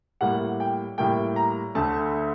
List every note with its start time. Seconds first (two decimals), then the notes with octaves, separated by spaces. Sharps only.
0.21 A2 G3 A#3 F#5
0.60 G5
0.98 A2 G3 A#3 G5
1.36 A#5
1.75 D2 D3 A3 A5